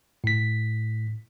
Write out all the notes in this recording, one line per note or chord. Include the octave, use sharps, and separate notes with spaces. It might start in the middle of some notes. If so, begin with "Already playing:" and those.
A2 B6